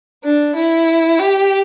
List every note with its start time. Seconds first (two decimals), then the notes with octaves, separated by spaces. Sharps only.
0.24 D4
0.56 E4
1.19 G4